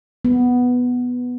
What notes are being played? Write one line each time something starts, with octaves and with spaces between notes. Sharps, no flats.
B3